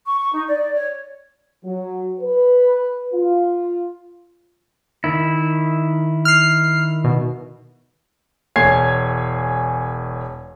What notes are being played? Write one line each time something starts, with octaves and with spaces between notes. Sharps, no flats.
C#6
C#6
D#4
D5
D5
C#5
F#3
B4
F4
D#3 E4
F6 C7
B2
E1 C#5 G#5 G#6 C7